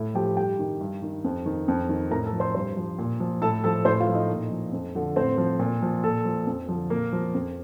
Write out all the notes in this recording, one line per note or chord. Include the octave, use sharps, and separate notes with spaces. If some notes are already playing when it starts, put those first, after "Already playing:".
Already playing: A2
F3 G4 G5
G2 G4 G5
D#3
G2
D#3
F2
D#3
F2
D#3
A2 A#4 A#5
A4 A5
F3
C5 C6
G2 C5 C6
F3
A#2
F3
A2 A4 A5
F3 A4 A5
A2 C5 C6
F4 F5
F3
D#4 D#5
A#2
F3
F2
D3 F3
A2 C4 C5
F3
A#2
F3
A#2 A4
F3
F2
D3 F3
A#2 A#3 A#4
F3
F2